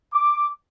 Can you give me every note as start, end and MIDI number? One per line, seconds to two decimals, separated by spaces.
0.12 0.47 86